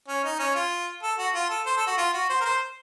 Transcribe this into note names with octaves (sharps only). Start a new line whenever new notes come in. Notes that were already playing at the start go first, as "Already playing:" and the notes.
C#4
D#4
C#4
F4
A4
F#4
F4
A4
C5
A4
F#4
F4
F#4
C5
A#4
C5